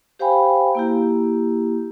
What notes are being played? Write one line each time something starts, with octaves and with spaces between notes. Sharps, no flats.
G4 C5 F5 G5 G#5 B5
A#3 E4 G4